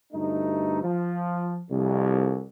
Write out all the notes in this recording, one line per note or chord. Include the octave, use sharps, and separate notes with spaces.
D2 G2 A3 D#4
F3
C2 F2